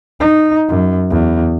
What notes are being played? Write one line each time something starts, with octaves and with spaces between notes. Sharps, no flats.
D#4
F#2
E2